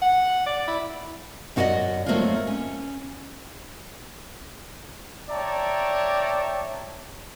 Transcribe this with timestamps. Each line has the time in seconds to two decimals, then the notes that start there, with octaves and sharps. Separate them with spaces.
0.02 F#5
0.46 D5
0.67 E4
1.56 F#2 D#4 F#4 A#4 D5 D#5
2.06 F#3 A3 A#3 C4 D#4 F4
2.47 C#4
5.30 C#5 D5 E5 G5 A5 A#5